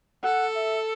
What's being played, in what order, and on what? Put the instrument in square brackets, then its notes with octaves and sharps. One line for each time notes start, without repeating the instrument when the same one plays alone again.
[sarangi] A4 [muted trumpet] F#5
[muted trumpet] E5